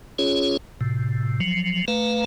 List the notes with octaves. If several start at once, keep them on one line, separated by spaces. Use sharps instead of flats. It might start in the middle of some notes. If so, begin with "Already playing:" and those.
C#4 F4 G#4 C#5
A2 C3
F3 F#3
A3 B4 F5 A#5